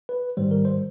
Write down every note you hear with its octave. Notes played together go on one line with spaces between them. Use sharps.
B4
G#2 D#3 G3 C5
A#4
C5